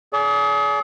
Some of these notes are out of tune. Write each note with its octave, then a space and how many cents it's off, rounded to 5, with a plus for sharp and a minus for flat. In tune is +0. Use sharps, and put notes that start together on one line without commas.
G#4 +30 D5 -35